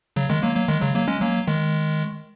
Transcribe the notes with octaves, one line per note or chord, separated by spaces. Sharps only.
C#3 F#3
D#3 G#3
F#3 A#3
F#3 A#3
D#3 G#3
C#3 F#3
F#3 A#3
G#3 C#4
F#3 A#3
D#3 G#3